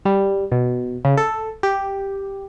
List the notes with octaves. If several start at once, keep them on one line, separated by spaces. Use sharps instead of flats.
G3
B2
C#3
A4
G4